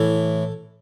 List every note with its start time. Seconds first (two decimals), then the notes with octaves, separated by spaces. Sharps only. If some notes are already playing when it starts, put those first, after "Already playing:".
Already playing: A2 E3 A4